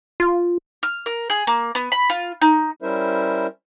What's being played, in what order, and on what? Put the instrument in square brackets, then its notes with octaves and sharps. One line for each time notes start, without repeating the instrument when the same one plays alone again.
[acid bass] F4
[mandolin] F6
A#4
G#4
A#3
B3
B5
F4
D#4
[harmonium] G3 C#4 E4 A#4 C5 E5